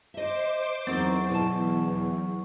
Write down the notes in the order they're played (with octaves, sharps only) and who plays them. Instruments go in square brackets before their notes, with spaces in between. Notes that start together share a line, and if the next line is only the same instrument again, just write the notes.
[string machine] C5 D6 [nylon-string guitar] D#5 E5
[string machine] E2 [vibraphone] F#3 C#6 [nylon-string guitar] C4 D#4 A#4
[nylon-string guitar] B2 A5